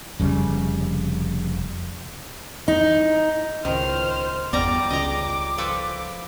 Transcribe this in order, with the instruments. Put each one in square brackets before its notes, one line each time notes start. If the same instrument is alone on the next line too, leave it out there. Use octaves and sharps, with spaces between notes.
[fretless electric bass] F1 C#3 G3
[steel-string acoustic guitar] D#4
[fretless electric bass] C#2 A2 [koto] D#3 [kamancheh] C5 F6
[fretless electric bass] G1 E2 B3 [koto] G3 D5 A#5 [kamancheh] D6
[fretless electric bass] C#2 [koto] D#5 A#5
[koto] F3 A4 B4